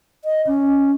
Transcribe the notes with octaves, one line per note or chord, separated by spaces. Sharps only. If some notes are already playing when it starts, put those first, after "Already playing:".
D#5
C#4